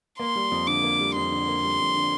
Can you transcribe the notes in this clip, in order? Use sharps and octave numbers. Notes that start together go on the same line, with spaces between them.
A#3 C6
G3
F2
D3 D6
A#3
G3
F2 C6
D3
A#3
G3
F2
D3